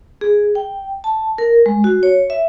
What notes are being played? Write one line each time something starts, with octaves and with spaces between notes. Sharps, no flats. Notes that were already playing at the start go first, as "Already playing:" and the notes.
G#4
G5
A5
A#4
G#3
F#4
C#5
E5